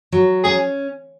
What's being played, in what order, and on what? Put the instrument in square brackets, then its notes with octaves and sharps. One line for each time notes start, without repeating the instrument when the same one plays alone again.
[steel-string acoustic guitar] F#3
[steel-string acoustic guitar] C#4 [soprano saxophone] G#4